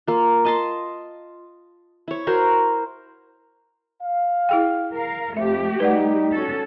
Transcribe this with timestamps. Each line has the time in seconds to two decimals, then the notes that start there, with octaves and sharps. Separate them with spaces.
0.07 A#3 F4
0.45 D#5 A5 C6
2.08 E4 C#5
2.27 F#4 A#4 C5
4.03 F5
4.49 E4 G#4 G5
4.92 A#4 F5
5.37 F2 A3 G4 E5
5.80 G3 D#4 B4 D5 F#5
6.32 C#4 F#4 A4